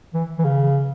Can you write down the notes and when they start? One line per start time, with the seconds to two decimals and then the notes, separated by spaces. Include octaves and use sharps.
0.14 E3
0.39 E3
0.44 C#3